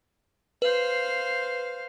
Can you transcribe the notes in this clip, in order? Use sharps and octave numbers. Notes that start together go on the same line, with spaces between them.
B4 C5 F5